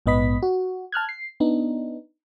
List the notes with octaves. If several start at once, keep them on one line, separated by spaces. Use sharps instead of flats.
A#1 G#2 B3 D#5 B5 B6
F#4
A5 F6 F#6 G#6
C7
B3 D4 D#4